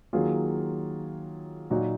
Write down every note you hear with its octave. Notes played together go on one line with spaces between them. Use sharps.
D#3 F#3 A#3 F4 G#4
A#2 F#3 A#3 D#4 F#4